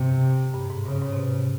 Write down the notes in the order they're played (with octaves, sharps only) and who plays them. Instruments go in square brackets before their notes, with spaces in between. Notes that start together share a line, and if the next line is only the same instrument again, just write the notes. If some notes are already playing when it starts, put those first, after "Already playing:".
Already playing: [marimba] G2 [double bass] C3
[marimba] G2
G#2
[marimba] G2 [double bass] C#3
[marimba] G#2
C3
B2